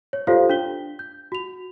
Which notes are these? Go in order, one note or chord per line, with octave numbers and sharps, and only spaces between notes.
C#5
F4 G4 A4 C5 D5 F5
D4 B6 G7
G6
F#4 F7